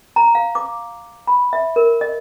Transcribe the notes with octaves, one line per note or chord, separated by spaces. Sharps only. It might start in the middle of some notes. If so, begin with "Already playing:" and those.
A#5
F5
D6
B5
E5
A#4
D#5